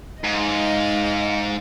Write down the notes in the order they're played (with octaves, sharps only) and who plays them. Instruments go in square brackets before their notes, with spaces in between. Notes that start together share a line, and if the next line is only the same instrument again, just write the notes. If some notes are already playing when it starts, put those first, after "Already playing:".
[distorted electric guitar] G#2 [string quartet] D#5 F5